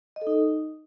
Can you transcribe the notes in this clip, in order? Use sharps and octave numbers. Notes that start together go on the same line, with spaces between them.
D#5
A4
D#4